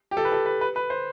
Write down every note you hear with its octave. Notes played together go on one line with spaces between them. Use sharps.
G4
A4
B4
A4
B4
B4
B4
C5